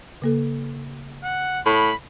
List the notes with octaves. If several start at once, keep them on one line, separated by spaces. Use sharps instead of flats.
C#3 A#3 A4
F#5
A2 B5